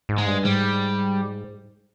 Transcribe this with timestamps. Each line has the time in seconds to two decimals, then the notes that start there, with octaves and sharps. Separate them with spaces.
0.09 G#2
0.18 G#3
0.27 G2
0.45 G#2 G3